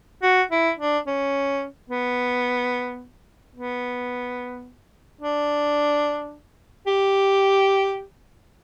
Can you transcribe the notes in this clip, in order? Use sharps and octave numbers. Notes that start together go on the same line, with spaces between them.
F#4
E4
D4
C#4
B3
B3
D4
G4